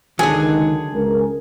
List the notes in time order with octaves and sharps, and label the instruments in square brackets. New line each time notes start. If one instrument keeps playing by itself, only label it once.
[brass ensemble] C#2 D#3 [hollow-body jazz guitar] D3 F#3 [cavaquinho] G#4
[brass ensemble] C#2 A#4